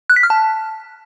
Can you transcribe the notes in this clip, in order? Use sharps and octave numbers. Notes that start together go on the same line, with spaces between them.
F#6
B6
F6
A5